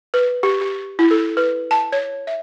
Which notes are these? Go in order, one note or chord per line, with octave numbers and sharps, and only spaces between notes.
B4
G4
G4
E4
A4
B4
A5
C#5
E5